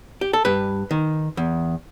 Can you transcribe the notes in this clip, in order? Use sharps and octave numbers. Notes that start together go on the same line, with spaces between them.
G4
A4
G2 B4
D#3
E2